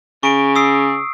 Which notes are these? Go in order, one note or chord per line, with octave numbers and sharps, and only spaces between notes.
C#3 C#6 D7
D#6 E6 C7